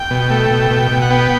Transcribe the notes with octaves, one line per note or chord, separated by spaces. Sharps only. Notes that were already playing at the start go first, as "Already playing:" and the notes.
Already playing: G5
B2
A3
B2
B2
B2
F#5
B3 G5